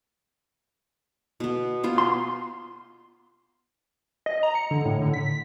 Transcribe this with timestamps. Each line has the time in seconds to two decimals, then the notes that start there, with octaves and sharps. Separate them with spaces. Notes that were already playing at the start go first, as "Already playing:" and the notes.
1.40 B2 B3
1.83 B3 F4 C5
1.98 C6
4.26 D#5
4.43 A#5
4.55 C#7
4.71 D3
4.85 A2
5.02 D3
5.14 B6